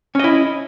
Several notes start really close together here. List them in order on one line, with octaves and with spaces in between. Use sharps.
C#4 D#5 E4